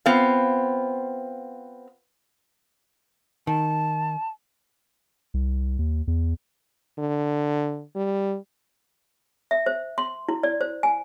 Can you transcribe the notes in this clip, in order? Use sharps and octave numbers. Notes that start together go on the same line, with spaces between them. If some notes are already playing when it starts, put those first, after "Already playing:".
B3 C4 F4 F5
D#3 A5
C2
D#2
E2
D3
G3
E5
C5
C6
E4
D5
C5
G#5